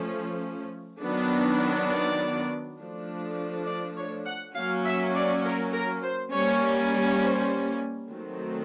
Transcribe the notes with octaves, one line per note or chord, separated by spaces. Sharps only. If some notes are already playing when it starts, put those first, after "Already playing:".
Already playing: F3 A3 C#4
D#3 F#3 B3 D4
D5
F3 A3 D4
D5
C#5
F#5
F#3 A#3 C#4 F5
E5
D5
A#4
A#4
C5
G3 A#3 C#4 C#5
C5
D#3 F#3 A3 C4